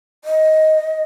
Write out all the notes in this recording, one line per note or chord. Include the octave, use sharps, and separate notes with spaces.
D#5